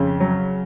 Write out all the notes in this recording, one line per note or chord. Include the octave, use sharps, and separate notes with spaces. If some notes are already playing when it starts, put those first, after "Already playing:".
Already playing: F2 C#3
F#3